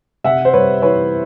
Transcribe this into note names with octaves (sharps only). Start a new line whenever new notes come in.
C3 E5 F#5
C5
G3 B4 C#5
E3 B4 C#5